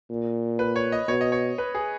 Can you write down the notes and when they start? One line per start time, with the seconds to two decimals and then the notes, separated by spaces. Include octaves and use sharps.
0.10 A#2
0.59 B4
0.76 C#5
0.92 D#5
1.08 B2 C#5
1.21 D#5
1.32 C#5
1.58 B4
1.75 G#4